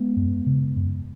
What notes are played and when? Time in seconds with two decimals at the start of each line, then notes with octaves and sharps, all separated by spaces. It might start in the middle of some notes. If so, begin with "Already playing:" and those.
Already playing: G#3 B3
0.16 F#2
0.46 C#3
0.76 F#2